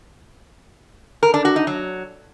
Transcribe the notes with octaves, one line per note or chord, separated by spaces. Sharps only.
A#4
D4
F#4
D#4
F#3